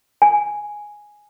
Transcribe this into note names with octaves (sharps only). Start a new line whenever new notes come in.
G#5